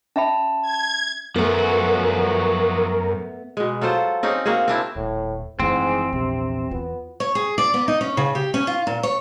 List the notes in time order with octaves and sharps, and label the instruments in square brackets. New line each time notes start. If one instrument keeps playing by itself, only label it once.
[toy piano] C#4 E5 B5 [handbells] A5
[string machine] G#6
[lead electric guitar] F#2 [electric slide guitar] F3 F#4 [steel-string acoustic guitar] A3 B3 [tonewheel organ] A#4
[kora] B2 G#3
F#3 F4 A4 C5
C4 C#4 D#4 G#4
A#3 C4 F#4 G#4
C4 D4 E4
[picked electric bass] D#1 [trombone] A2
[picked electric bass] F#1 E3 [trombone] G#2 [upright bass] F3 A3 [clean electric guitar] C4
[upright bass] A#1 [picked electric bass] E2 [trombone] C3
[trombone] B3 [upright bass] F4
[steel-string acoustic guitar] C#5
G#4
D5
B3
D#4
C#4
C#3
G4
C#4
F4
A#2
C#5